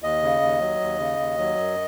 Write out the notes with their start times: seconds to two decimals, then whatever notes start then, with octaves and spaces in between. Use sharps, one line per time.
0.02 D#2 D#5
0.22 C#3
0.41 D#2
0.61 F#3
0.80 D#2
0.99 C#3
1.19 D#2
1.39 F#3
1.57 F#2